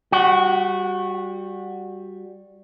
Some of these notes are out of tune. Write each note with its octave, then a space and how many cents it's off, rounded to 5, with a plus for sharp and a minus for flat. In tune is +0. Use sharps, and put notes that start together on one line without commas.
G3 +0 F#4 -20 F#5 +40